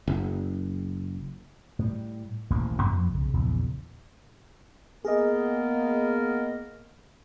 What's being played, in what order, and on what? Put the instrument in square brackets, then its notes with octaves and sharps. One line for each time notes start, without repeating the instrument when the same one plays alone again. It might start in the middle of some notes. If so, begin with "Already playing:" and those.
[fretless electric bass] F#1
[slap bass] A2 G3
D#1 A1 G#2 A#3
F2 F3 A#3
B1 C#3
A#1 E2 C#3
[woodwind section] A#3 B3 A#4 [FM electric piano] G#4 D#5